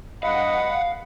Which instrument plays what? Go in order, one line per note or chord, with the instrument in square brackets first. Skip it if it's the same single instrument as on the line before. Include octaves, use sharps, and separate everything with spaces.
[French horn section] G2 D#5 [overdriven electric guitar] F5 [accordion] F#5 [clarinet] B5